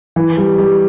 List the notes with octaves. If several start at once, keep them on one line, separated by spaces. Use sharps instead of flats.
E3
G3
G3